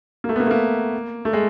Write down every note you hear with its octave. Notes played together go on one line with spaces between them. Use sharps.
A#3
A3
B3
A#3
A3
A#3
A3
G#3